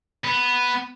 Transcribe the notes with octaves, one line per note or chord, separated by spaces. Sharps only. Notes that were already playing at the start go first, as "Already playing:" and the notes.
B3